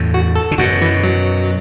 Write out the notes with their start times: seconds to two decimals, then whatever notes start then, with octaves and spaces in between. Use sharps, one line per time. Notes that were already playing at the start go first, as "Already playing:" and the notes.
Already playing: E2 A2
0.14 F#4
0.36 A4
0.51 D3
0.58 F#2 B2 F#4
0.82 E3
1.04 F#3